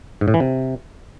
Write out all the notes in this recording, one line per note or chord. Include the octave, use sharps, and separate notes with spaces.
G#2
A2
E3
C3